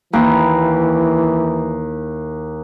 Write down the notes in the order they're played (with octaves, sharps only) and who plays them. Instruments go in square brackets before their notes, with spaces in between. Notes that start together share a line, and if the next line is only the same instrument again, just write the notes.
[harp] D#2 E4 [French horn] E3